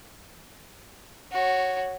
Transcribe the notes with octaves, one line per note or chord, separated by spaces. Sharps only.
F#4 C#5